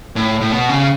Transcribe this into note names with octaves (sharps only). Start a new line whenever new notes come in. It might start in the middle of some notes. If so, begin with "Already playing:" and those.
A2
A2
B2
C#3